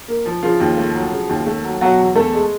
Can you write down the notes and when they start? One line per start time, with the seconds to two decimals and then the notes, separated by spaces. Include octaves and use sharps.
0.08 A#3
0.26 F3
0.43 C#3 F3 F4
0.60 D#2
0.77 A3
0.94 F#3
1.12 C#3
1.29 D#2
1.46 A3
1.64 F#3
1.81 B2 F#3 F#4
1.99 E2
2.16 E2 A3 A4
2.33 G#3